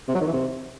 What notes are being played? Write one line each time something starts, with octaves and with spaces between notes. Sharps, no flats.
C3
F#3
D#3
E3
C3